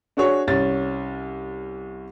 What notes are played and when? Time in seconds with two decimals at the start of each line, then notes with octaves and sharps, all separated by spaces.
0.17 D4 F#4 G#4 C#5
0.47 C2 C#4 A6